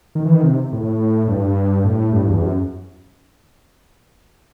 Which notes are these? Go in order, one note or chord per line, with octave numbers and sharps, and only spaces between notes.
D#3
E3
D#3
C3
A2
G2
A2
G2
E2
F#2